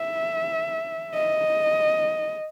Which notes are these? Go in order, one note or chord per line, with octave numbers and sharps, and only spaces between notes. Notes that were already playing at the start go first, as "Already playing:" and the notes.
Already playing: E5
D#5